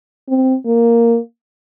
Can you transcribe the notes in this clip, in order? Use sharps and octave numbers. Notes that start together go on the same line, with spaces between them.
C4
A#3